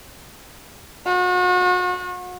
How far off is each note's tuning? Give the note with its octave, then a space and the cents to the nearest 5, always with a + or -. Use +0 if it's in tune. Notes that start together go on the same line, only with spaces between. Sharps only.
F#4 -40